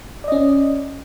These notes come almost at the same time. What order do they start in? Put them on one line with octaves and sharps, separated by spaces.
D5 D#5 C#4